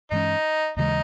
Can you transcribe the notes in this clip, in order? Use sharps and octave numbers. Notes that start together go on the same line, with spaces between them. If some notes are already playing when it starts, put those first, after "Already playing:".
G2 E3 G#3 C#4 D#4
D#2 C#3 E3 G#3 D#4